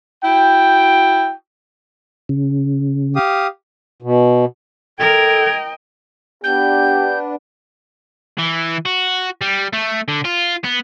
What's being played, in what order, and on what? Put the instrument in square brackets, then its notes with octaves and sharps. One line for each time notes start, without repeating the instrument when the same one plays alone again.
[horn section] E4 F#4 G5
[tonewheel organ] C#3
[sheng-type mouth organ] G4 F5 D#6
[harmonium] B2
[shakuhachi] A4 [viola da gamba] A#4 [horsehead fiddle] D#5 G5 [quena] G#6
[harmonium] B3 D4 [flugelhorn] G4 [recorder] G6
[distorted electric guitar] E3
F#4
G3
A3
D3
F4
B3